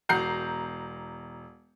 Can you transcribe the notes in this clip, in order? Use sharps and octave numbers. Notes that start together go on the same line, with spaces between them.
E1 A#5 G6 C7